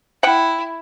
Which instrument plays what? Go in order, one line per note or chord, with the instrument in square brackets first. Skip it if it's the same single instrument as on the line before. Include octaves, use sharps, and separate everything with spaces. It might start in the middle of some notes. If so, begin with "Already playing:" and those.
[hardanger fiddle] E4 [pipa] F#5 G5